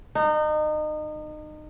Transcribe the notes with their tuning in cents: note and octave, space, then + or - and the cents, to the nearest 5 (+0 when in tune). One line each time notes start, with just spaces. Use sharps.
D#4 -30